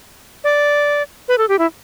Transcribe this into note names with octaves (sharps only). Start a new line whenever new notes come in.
D5
B4
A4
G4
E4